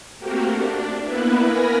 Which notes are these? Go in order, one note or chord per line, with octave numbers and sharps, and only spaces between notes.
A3 A#3 C4 F#4 G4 A#4
D4
A#3 B3 E4 B4
A#4 G#5 B5 A#6